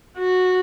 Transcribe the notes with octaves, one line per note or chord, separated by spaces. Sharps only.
F#4